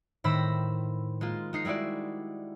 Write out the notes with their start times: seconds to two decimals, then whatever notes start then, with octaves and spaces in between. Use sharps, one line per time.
0.24 A2 D#3 C5 B5 E6 A#6
1.21 G#3 A#3 F4
1.53 G#3 D#4 C7
1.65 G3 G#3 E4 F#4 D5